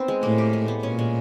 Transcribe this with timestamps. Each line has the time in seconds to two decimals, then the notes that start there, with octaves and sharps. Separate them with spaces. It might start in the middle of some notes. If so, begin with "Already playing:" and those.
Already playing: B3 C4 D#4
0.08 G#3
0.23 A2 A#3
0.38 G4
0.53 G#3
0.68 B3
0.83 A#2 C#4
0.99 G#3